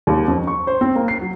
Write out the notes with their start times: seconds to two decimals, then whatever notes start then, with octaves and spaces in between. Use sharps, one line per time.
0.07 D#2
0.28 F2
0.47 C#6
0.67 C5
0.81 C4
0.96 A#3
1.08 C7
1.21 F#3